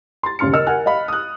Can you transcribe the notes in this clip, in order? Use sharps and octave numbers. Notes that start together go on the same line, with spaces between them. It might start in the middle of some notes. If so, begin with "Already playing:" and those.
C6 A6
D#1 C#3 C6 F6 C#7
A#4 D#5 E6 F6
A#4 F#5 G#5 F6 F#6
D#5 F5 B5
D#6 F#6